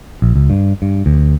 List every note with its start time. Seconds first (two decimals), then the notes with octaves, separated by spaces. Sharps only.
0.22 A#1
0.36 C#2
0.50 G2
0.82 G2
1.06 D2